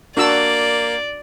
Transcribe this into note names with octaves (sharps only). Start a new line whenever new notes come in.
A#3 D4 F#4 D5 E6